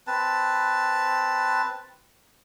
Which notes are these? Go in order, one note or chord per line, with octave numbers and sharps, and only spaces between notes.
C4 B4 A5